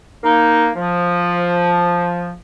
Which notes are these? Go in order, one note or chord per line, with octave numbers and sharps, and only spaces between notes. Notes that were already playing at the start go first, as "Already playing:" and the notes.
A#3 D#4
F3